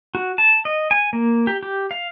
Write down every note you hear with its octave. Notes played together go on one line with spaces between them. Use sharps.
F#4
A5
D#5
G#5
A#3
G4
G4
F5